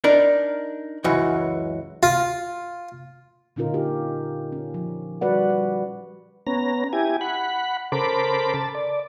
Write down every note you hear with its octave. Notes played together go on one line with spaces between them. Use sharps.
D4 D#4 A#4
C#2 F#2 E3 F#4
F4
A#2 D3 C#4 D#4 F4 A#4
G4
C#4
F3
G3 F#4 B4 D5 F#5
G3
B3 C#4 A#5
E4 G4 G#5
F#5 B5
C#3 A4 A#4 C5 B5 D6
A5
D5